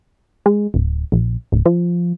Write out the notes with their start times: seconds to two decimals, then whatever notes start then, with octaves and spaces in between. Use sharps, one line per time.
0.46 G#3
0.74 D1
1.12 A#1
1.52 D1
1.66 F3